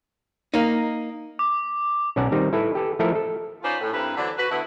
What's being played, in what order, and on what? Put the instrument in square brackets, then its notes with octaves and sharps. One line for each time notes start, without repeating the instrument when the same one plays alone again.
[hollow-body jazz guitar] A#3 D#4
[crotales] D6
[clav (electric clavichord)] B1 C#4 D5 F#5 A5 A#5
D#3 G3 C4 D#4
E4 A4 B4
G4 A4 B4
F3 A3 E4 A4 A#4 F5
A4
[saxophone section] C#4 D#4 F4 B4 C5 D5
A2
G2 C4 E4 A#4 B4
D3 E3 F#3 C4 D4
F#4 B4
D3 A3 B3 E4